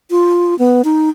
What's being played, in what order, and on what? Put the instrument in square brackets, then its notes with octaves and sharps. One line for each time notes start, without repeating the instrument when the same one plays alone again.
[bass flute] F4
B3
D#4